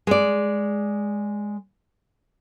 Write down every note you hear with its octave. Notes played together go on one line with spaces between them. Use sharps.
G#3 D5